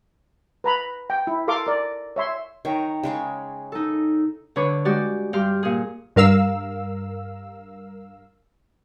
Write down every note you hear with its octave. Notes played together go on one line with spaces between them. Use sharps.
B4 A#5 B5
G5
E4
A4 A#4 F5 C6 D6
A#4 D5
C#5 E5 C6
D#3 C#5 G5 A#5
C#3 G#3 C#6
D#4 A4
D3 B4 C#5 D6
G#3 F#4 G4 D5
G2 G4 G5 C6 F6
A#2 G#4
G2 A#4 F5 E6